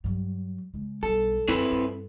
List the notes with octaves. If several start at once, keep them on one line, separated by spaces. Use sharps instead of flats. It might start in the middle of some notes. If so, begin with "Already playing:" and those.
G2 F#3
C#3 G#3
B1 G3 A4
F#2 C4 E4 B4
G2